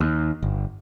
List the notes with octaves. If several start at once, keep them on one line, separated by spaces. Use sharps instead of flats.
D#2
G1